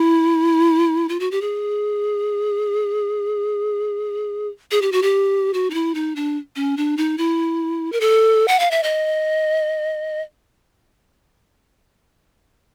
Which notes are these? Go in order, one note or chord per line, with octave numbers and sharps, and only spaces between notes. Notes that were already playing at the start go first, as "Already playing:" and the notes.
Already playing: E4
F4
F#4
G4
G#4
G#4
G4
F#4
G4
F#4
D#4
E4
D#4
D4
C#4
D4
D#4
E4
A#4
A4
F#5
F5
E5
D#5